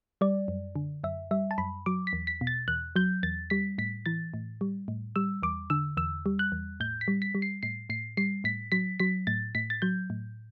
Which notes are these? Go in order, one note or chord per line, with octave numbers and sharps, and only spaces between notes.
G3 D5
F#2
D3
F#2 E5
G3 E5
A5
F#2 B5
F#3 D6
B6
E2
B6
B2
A6
E2 F#6
F#3 G6
E2 A6
G3 B6
A2 B6
E3 A6
A2
G3
A2
G3 E6
E2 D6
D3 E6
E2 E6
G3
F#6
E2
A2 G6
B6
G3
B6
G3
C7
A2 C7
A2 C7
G3 C7
A2 B6
F#3 B6
F#3 B6
A2 A6
A2 B6
A6
F#3 G6
A2